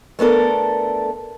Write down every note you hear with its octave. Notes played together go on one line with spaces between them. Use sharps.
A3 B3 D4 A4 A#4